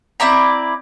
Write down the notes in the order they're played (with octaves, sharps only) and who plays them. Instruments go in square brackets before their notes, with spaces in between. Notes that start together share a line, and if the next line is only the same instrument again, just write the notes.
[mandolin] C4 E4 D5 A#5